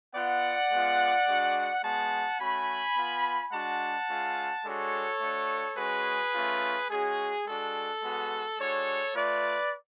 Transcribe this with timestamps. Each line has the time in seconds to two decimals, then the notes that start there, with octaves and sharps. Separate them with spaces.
0.15 B3 F4 D5 F#5
0.71 G#3 B3 F4
1.27 G#3 D4 F#4
1.83 G#3 B3 F#4 F#5 A5
2.40 A3 C#4 F#4 G#5 B5
2.96 B3 F4
3.52 G#3 D4 F#4 F#5 A5
4.09 G#3 C#4 F4
4.65 G#3 D4 F#4 A4 C#5
5.21 A3 D4 F#4
5.77 G#3 C#4 F#4 G#4 B4
6.34 A3 C#4 F4
6.90 G#3 C#4 F#4 G#4
7.46 G#3 D4 F#4 A4
8.02 G#3 B3 F#4
8.59 G#3 D4 F#4 A4 C#5
9.15 A3 F4 B4 D5